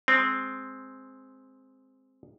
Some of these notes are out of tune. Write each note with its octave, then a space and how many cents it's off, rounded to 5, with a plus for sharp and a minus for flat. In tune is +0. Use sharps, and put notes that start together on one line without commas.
G#3 +0 C4 +0